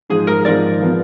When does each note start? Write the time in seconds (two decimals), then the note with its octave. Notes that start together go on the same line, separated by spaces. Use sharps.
0.10 G#2 F3 G#3 G#4
0.27 A#4
0.45 G#2 F3 G#3 A#4 D5
0.80 F3 B3 F4